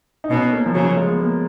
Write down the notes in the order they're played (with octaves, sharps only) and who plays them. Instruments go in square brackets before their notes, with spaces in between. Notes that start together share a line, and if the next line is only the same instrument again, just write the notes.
[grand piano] D#4
[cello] B2 [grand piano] C#4
[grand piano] A#3
F3
[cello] C#3 [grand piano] F#3
[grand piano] F#3
G#3
B3
A#3